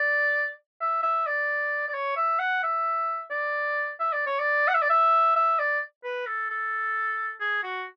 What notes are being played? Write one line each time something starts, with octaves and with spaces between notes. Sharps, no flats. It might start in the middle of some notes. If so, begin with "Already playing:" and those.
Already playing: D5
E5
E5
D5
D5
C#5
E5
F#5
E5
D5
E5
D5
C#5
D5
F#5
E5
D5
E5
E5
D5
B4
A4
A4
G#4
F#4